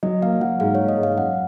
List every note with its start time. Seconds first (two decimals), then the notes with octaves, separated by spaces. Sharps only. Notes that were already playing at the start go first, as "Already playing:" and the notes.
0.03 F#3 D#5
0.22 A#3 F5
0.41 F#3 F#5
0.60 G#2 F5
0.75 C#5
0.80 A#3
0.89 D#5
0.98 G#2
1.03 F5
1.17 F#2 F#5